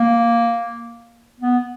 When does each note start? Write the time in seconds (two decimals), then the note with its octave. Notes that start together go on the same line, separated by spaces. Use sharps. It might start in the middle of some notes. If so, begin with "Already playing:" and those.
Already playing: A#3
1.40 B3